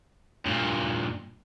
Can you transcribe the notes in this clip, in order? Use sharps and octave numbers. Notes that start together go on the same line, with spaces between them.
G2 A#2